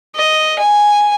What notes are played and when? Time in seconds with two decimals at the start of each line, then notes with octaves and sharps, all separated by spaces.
0.16 D#5
0.59 G#5